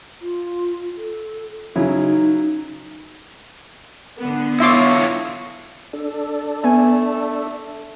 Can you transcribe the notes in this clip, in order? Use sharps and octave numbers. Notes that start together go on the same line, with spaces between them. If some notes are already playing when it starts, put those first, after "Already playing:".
F4
A4
C#3 F#3 D#4 E4
D3 B3
E4 F4 C#5 E5 C6 D6
D4 A4
A3 B3 G#5